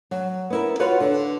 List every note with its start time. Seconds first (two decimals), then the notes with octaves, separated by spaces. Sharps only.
0.11 F#3
0.50 B3 E4 A#4
0.80 F4 F#4 B4 C#5 F#5
1.00 D3